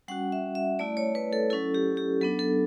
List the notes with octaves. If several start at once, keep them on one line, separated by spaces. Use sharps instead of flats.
G3 C#4 F#4 F#5
E5
E5
A3 E4 D5
C#5
B4
A4
F#3 C#4 E4 A4
G4
G4
F#3 B3 D4 A4
A4